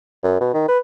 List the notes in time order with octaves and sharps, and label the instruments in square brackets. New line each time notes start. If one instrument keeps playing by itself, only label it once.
[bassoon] F#2
B2
D#3
B4